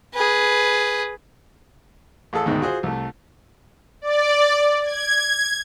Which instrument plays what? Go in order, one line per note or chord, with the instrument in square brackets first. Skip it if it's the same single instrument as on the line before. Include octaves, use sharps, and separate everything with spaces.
[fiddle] G#4 B4
[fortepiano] A1 G#4 A4 E6
D2 G#2 B2 D#3
F4 F#4 G#4 C5
C2 A3
[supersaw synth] D5
G#6